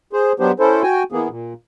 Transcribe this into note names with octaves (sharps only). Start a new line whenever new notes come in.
G#4 C5
F#3 B3 D4 G4 C5
C#4 E4 A4 C5
F#4 G5 G#5
E3 A#3 B3 G#4
A#2